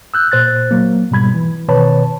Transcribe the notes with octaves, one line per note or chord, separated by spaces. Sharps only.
E6 F#6 G6
A#2 C5 F#6 A6
F#3 A#3
G#2 B2 G3 B5 G#6
E3
B2 D#3 B4 C#5 A5 B5